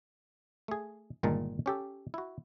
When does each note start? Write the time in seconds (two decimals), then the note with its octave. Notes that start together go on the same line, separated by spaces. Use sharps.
0.68 A3 G#4
1.23 G1 A#2 D#3 G#3 D#4 A5
1.66 C#4 G4 A4
2.14 E4 F#4